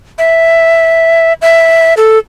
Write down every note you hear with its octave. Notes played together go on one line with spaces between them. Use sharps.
E5
E5
A4